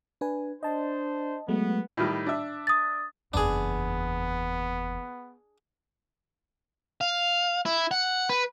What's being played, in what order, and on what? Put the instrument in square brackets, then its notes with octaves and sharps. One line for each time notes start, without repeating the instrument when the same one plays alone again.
[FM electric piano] D4 B4 G#5
[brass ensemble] D4 C5 [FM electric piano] D#5 A5
[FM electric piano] F#3 G#3 A3 [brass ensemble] B3
[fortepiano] A2 D#3 G3
D4 E5
[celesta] D#6 A6
[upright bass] F#1 E2 [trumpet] B3 [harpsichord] D4 G#4
[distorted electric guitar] F5
E4
F#5
B4